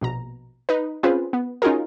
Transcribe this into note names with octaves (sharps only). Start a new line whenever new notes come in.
A#1 B2 A#5
D#4 B4
C4 C#4 F4 G#4 B4 C5
B3
C#4 D#4 F4 F#4 G#4 A#4